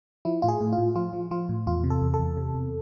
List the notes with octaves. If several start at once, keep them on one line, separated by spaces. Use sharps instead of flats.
F3 E4
A2 F4
G#4
A2
F4
A2
F3 F4
F3
F3 F4
A2
E2 F4
C3
A4
E2
A4
E2
C3
E2